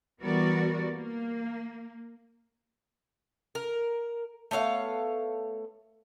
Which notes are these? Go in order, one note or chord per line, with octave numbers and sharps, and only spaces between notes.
E3 G3 B3 F#4 A#4 D5
A#3
A#4
A3 B3 C#5 F5